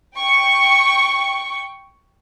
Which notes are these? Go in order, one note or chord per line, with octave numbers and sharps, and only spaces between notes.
G5 C#6